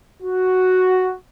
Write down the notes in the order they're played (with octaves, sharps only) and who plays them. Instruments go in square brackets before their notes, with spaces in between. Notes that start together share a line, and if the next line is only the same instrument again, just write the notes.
[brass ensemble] F#4